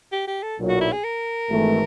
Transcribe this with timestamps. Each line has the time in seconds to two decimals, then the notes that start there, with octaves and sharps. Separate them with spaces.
0.12 G4
0.28 G4
0.43 A4
0.58 B1 A#2 F#3
0.69 F#4
0.81 E4
0.93 G#4
1.04 A#4
1.49 G#1 G#2 E3 A3